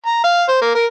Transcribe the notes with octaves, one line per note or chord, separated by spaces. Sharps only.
A#5
F5
C5
A#3
A#4